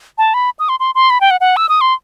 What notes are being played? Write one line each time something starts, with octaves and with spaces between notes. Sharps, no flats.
A5
B5
D#6
C6
C6
C6
B5
G5
F#5
F#5
E6
D#6
C6